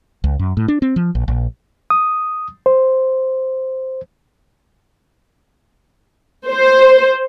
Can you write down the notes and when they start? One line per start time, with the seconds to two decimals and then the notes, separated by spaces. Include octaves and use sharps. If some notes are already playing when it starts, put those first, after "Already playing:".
0.24 C#2
0.39 F#2
0.57 A2
0.68 D4
0.82 C4
0.96 F3
1.15 A#1
1.28 A#1
1.90 D#6
2.66 C5
6.49 C5